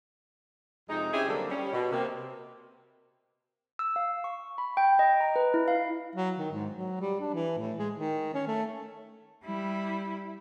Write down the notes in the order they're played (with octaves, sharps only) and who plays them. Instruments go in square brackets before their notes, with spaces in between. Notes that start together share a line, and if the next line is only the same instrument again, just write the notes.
[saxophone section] F2 C3 G#3 D#4
C4 C#4 E4 G4 G#4
D3 F#3 G3 A#3 C4 A4
G3 C#4
B2
C3 A#3
[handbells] E6
F5
C#6
B5
G5
D#5
A#5
B4
E4
F5
[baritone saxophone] F#3
D#3
G#2
F#3
G3
D4
E3
A2
G#3
D#3
C#4
A3
[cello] G3 E4